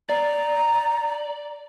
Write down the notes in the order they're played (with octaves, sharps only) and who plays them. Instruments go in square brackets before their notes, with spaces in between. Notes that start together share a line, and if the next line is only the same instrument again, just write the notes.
[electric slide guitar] D5 [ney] A#5